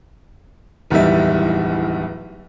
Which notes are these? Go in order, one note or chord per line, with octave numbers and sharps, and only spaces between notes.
D1 E2 D#3 E3 G3 E5